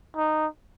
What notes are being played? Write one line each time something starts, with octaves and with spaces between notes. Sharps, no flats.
D#4